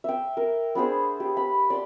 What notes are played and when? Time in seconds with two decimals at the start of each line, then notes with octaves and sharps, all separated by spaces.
0.04 E5 G5
0.37 A#4
0.75 B3 D4 G#4 C5
1.20 G4
1.37 B5
1.70 D5 C6